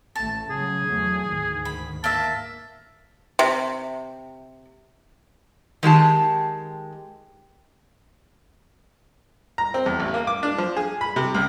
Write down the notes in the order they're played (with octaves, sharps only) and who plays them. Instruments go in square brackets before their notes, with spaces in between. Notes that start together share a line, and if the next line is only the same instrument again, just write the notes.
[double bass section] A1 A3 [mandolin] A5
[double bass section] C#3 F#3 [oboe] G#4
[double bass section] E2 F#3 A3
D2 G#2 D#3
[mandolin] B5
[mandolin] A#3 E5 [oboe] A5
[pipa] C3
[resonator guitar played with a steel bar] D#3 G#3 G4 A5
[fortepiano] A#5
C4
E2
A1
A#3
D6
D4
F3
G#4
B5
C3
C#2